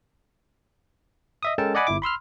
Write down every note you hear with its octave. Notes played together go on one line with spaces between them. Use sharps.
D#5 E5 D#6
G#3 C#4 A4 A#4 G5 A5
D5 D#5 F#5 G#5 B5 D6
G1 E4 D6
B5 C6 E6 F6